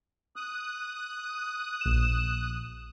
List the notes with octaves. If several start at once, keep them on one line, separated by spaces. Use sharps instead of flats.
D#6 F#6
A#1 E7